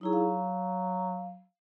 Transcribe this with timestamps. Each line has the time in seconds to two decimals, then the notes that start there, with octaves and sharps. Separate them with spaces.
0.01 F#3 D#4 E4 G#4
0.13 F5